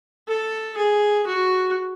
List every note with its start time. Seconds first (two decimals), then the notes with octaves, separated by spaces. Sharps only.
0.28 A4
0.77 G#4
1.27 F#4